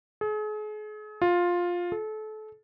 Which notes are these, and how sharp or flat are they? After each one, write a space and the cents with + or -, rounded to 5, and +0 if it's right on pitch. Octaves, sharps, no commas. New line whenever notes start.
G#4 +40
F4 +10
A4 -30